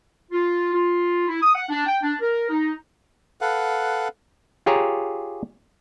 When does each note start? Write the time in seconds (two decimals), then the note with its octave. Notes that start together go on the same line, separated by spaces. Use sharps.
0.31 F4
0.73 F4
1.28 E4
1.42 D#6
1.55 F#5
1.70 D4
1.87 G5
2.03 D4
2.21 A#4
2.50 D#4
3.41 A4 B4 F5 F#5
4.66 F4 G4 G#4 C#5 A#5